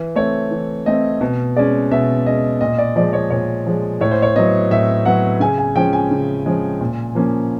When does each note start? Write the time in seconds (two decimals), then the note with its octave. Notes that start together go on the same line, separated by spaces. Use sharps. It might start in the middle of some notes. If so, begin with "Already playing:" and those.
Already playing: E3
0.16 A3 C4 C#5
0.51 E3
0.86 A3 C4 D#5
1.21 B2
1.56 G#3 C#4 D5
1.91 B2 E5
2.26 G#3 C#4 D#5
2.61 A#2 D#5
2.78 D5
2.96 F3 G#3 D5
3.13 C#5
3.30 A#2 C#5
3.66 F3 G#3
4.01 A2 C#5
4.11 C5
4.22 C#5
4.36 F#3 B3 D#5
4.71 A2 E5
5.05 F#3 B3 F#5
5.40 C#3 G#5
5.58 G#5
5.76 F3 G#3 C#4 G5
5.93 G#5
6.11 C#3
6.46 F3 G#3 C#4
6.81 A#2
7.15 F3 A#3 C#4